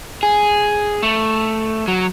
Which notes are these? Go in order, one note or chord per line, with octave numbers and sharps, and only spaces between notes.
G#4
A3
F#3